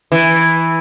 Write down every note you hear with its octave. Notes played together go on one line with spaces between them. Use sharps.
E3